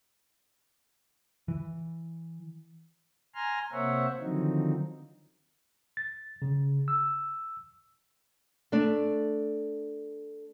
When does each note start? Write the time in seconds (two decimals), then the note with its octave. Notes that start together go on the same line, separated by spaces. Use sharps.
1.48 E3
3.35 G#5 A#5 C6 F6
3.73 C3 A#3 C5 C#5 E5 F#5
4.20 D3 D#3 F3 F#3 C4 D#4
5.97 A6
6.42 C#3
6.88 E6
8.72 A3 D4